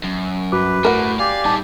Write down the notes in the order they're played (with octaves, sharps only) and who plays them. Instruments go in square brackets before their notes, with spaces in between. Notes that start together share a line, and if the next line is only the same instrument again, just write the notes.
[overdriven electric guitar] F#2
[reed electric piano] G2 F#4 D6 [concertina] B4
[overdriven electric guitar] A2 [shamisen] A#4 F#5
[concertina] G4 D5 G#5 [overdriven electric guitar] F5
[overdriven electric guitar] G3 D#4 [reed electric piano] A5